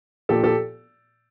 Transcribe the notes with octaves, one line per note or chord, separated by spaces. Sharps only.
A#2 F3 G4 A4
G4 A4